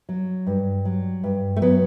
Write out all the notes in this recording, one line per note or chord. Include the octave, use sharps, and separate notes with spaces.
F#3
G2
F#3
G2
A3
F#3 B3